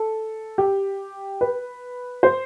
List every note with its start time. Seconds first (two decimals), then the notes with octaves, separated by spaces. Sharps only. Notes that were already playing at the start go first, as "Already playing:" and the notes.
Already playing: A4
0.58 G4
1.41 B4
2.23 C5